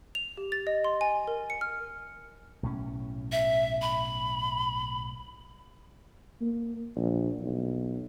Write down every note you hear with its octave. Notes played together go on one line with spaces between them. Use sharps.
F7
G4
A6
D#5
C6
G#5
A#4
C#7
F6
B1 A2 C#4
E5
B5
A#3
A#1
B1